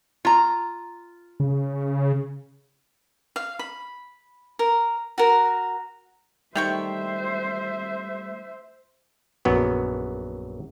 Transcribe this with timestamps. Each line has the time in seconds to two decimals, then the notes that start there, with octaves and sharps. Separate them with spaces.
0.25 F4 A#5
1.40 C#3
3.36 F5
3.59 B5
4.59 A#4
5.18 F#4 A#4
6.55 D#3 G3 A3 C5 E5 G5 C#6
9.45 A#1 F#2 F#3 B3